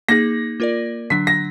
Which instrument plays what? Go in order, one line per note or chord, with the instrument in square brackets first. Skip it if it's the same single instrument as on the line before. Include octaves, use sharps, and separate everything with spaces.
[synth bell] A#3 D#4 G#4 [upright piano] A#6
[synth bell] A#3 F4 A#4 D5
[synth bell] D3 F#3 D4 [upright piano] B6
[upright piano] A#6